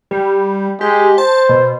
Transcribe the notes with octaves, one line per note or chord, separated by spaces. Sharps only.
G3
G#3 G4
C5 A5
B2